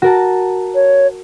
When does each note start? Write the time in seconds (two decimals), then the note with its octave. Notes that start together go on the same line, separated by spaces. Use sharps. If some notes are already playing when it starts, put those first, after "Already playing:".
0.02 F#4 A#4 A5
0.75 C#5